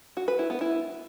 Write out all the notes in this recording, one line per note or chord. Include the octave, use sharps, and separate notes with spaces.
F#4
B4
E4
B3
E4